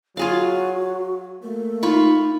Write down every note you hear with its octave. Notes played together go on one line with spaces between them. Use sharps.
F#3 F4 F#4 G#4 F5
A3 A#3
D#4 F4 B5 C#6